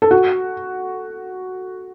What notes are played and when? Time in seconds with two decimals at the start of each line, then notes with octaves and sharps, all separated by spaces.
0.02 A4
0.11 F#4